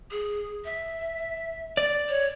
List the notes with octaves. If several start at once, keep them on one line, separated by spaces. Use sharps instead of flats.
G#4
E5
D5
C#5